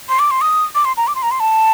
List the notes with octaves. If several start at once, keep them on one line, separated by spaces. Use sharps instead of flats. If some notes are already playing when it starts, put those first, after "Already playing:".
C6
D6
C6
D#6
D6
C6
A#5
D6
C6
A#5
C6
A5